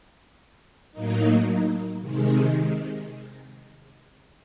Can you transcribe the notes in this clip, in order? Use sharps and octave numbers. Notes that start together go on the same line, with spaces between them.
A2 F#3 A#3 D#4
C3 D#3 G#3